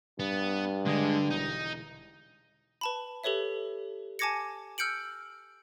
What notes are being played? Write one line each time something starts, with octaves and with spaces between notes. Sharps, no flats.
G2 B3
D3 G#3
E1 D#4
B4 A5 B5
G4 A4 B4 C#5 E5
G#5 A5 D6 G#6 A#6 C#7
E6 F6 G6 C#7 D7 F#7